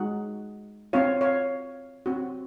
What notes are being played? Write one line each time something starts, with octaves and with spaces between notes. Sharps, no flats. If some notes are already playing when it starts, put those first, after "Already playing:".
Already playing: G#3 D#4 F#4 D#5 F#5
C4 F4 C#5 F5
C#5 F5
C4 F#4